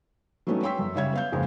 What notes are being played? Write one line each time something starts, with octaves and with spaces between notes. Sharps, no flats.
F#3 G3 A3 B3 C#4 D#4
C#5 G5 C6 C#6 E6 B6
F#2
C#3 G3 C#5 E5 G#6
B3 F5 G6
F2 G#2 C#3 G#3 A#3